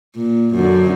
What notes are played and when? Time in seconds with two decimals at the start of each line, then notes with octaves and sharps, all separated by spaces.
0.16 A#2
0.55 F#2 D3